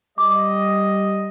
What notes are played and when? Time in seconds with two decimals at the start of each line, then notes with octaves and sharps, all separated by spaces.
0.18 G3 D#5 D6